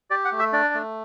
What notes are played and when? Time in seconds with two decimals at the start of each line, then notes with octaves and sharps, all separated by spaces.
0.10 G4 D5
0.25 F#5
0.32 A3
0.39 E5
0.53 D4 D5
0.74 A3